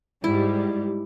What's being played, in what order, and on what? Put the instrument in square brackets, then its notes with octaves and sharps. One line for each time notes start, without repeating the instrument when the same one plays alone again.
[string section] G#2 G3 [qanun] E4